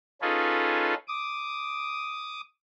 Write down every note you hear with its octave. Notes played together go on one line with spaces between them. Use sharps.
C#4 D#4 F4 G#4 A4 B4
D6 D#6